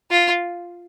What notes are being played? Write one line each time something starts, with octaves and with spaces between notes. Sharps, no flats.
F4